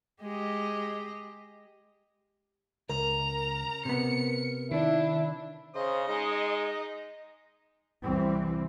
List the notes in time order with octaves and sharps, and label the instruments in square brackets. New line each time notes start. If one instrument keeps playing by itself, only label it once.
[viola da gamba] G#3 G4 D#5
[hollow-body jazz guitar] C#2 [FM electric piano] A#4 [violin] A#5
[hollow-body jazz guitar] C3 B3 [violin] C#7
[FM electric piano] D#3 [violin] D4 [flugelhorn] E4
[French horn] C#3 [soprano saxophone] C5 [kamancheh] D#5
[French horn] G#3 [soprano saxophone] D#4
[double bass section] C2 E3 G3 C4